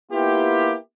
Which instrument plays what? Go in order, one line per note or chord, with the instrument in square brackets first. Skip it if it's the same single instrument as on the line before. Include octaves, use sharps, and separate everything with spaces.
[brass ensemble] A#3 B3 E4 F4 G4